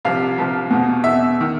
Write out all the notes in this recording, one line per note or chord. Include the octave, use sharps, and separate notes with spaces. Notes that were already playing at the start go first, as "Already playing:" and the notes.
C2 C3 F3 F5
C2 C3 F3
E2 B2
E2 B2 E5
D#3